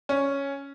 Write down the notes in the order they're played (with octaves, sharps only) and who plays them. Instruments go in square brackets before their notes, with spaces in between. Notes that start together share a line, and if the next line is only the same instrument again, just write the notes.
[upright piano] C#4